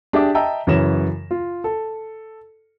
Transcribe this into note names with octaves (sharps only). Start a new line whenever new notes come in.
D4 G4 G#4 E5 G5 D6
D#5 E5 G5 A5 A#5 E6
F#2 C#3 E3 C#5 A#6 E7
F4
A4